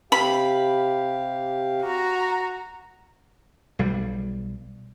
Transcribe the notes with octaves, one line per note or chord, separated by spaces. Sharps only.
C3 G4 F5 B5
F#4 A#5
B1 G3